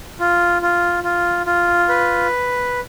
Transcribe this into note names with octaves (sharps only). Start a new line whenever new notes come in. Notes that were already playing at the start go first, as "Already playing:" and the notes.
F4
F4
F4
F4
B4